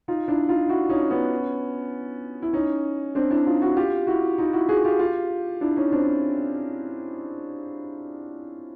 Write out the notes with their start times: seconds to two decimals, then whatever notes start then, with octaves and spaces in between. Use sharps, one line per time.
0.08 D#4 F4
0.28 D4 E4
0.49 D#4 F4
0.69 E4 F#4
0.89 C#4 D#4
1.10 B3 C#4
2.42 E4
2.53 C#4 D#4
3.15 C4 D4
3.30 D4 E4
3.46 D#4 F4
3.61 E4 F#4
3.77 F4 G4
4.07 E4 F#4
4.38 D#4 F4
4.53 E4 F#4
4.69 F#4 G#4
4.84 F4 G4
4.99 F4 G4
5.61 D4 E4
5.76 C#4 D#4
5.92 C4 D4